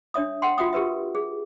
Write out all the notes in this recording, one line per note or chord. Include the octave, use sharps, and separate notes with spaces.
D4 C#5 E5 D#6
F#5 G5 C6
F4 F#4 E5 G5 D#6
G4 A#4 B4 E5
G#4